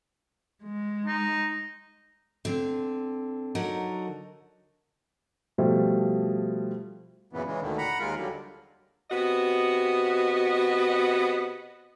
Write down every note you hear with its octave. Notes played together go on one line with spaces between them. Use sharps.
G#3
D#4
D3 C4
D3 F#3 D#4 A#4
B2 F3 G3 A3
F#2 A#2 C#3 E3 B3
C#3 E3 G#3
D2 A#2 D3 D#3
F#5 A#5 B5
D#2 G#3 F4 A#4
D3 F#3 G3
C3 B3 F#4 D#5